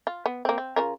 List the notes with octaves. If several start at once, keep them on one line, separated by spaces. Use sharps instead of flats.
F4
B3
A#3 C4
C4
C#3 F4 A#4